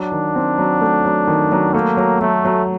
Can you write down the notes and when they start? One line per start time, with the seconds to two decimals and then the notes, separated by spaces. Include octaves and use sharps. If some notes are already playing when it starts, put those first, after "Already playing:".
Already playing: F#3 D4
0.12 D#3
0.35 C4
0.58 F#3
0.81 A3
1.05 F#3
1.27 D#3
1.52 F#3
1.74 A3 A#3
1.97 F#3
2.21 F#3 A3
2.45 F#3